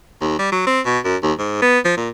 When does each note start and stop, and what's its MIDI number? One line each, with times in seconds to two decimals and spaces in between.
0.21 0.34 39
0.38 0.49 55
0.52 0.64 54
0.67 0.80 60
0.85 0.98 47
1.05 1.16 42
1.23 1.33 39
1.38 1.59 44
1.62 1.79 59
1.85 1.95 53
1.97 2.09 46